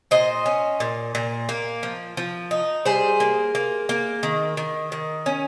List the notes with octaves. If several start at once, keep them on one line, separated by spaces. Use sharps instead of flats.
A#2 C5 D#5
C#4
A#2
A#2
A#3
F3
F3
D#4
G3 G#4 C5
A#3
A#3
A#3
D#3
D#3
D#3
C#4